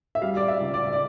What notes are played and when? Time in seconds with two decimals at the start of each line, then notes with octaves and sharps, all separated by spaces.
0.15 E5
0.22 G3 F5
0.37 D5
0.48 E5
0.61 C#2
0.74 D5
0.93 D5